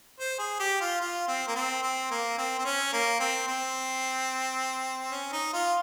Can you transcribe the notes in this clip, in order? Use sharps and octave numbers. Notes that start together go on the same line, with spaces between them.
C5
G#4
G4
F4
F4
C4
A#3
C4
C4
A#3
C4
C4
C#4
A#3
C4
C4
C#4
D#4
F4